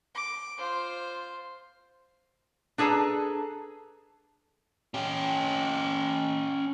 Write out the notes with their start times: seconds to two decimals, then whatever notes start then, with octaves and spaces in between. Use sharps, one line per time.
0.15 D6
0.58 F4 C5
2.78 D4 G#4 A4 B4 A#5
4.94 C#4 G4